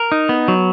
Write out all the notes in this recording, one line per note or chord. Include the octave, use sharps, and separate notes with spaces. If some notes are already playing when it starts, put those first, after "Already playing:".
Already playing: A#4
D#4
B3
F#3